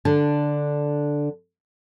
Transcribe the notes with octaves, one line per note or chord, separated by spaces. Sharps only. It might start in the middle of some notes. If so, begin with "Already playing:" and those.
D3 D4